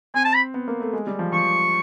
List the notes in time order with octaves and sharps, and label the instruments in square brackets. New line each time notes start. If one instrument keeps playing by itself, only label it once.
[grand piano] C4 [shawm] G#5
[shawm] A5
B5
[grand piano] B3
A#3
A3
G#3
G3
F3
[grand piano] F3 [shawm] C#6